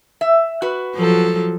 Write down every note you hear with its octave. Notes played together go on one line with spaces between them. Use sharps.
E5
F#4 B4
F3 F#3 A4